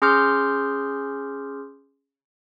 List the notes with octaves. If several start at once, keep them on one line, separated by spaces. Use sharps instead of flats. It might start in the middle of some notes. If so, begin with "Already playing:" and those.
C#4 G#4 C6 D6 F6 G6